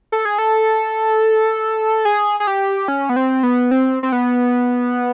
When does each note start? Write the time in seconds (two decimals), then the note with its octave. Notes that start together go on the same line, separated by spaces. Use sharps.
0.12 A4
0.25 G#4
0.38 A4
2.05 G#4
2.40 G#4
2.47 G4
2.88 C#4
3.09 B3
3.16 C4
3.43 B3
3.71 C4
4.03 C4
4.12 B3